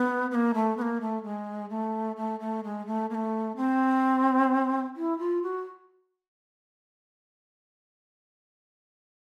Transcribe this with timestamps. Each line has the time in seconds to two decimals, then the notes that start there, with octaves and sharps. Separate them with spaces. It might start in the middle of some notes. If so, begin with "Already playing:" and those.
Already playing: B3
0.31 B3
0.35 A#3
0.54 A3
0.77 B3
0.82 A#3
1.01 A3
1.24 G#3
1.70 A3
2.17 A3
2.40 A3
2.64 G#3
2.87 A3
3.10 A#3
3.15 A3
3.57 C4
4.96 E4
5.19 F4
5.43 F#4